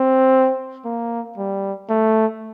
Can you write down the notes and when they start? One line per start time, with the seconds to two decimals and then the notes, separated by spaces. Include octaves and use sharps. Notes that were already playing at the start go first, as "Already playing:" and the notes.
Already playing: C4
0.85 A#3
1.37 G3
1.89 A3